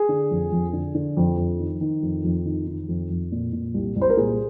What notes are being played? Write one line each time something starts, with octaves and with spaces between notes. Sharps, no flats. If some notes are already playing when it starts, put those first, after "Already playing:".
Already playing: G#4
D3
F2
F2
D3
D3
F2
F2
D#3
D#3
F2
F2
D#3
D#3
F2
F2
A#2
A#2
C2
C2
C5
A#4
A#2 G#4